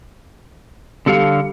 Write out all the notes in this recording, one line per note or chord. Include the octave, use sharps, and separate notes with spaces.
D3 G3 A4 F5 C#7